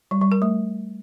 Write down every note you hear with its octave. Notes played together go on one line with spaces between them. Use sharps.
G3
G3
A#4
A3